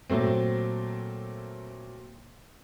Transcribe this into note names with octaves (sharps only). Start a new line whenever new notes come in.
A#2 F#3 A3 C4